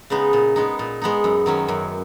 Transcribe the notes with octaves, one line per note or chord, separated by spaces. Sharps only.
C#3 G#3 B3 D#4
A#2
G#3 B3 D#4
A#2
G#3 B3 D#4
F#2
D#3 F#3 C#4
F#2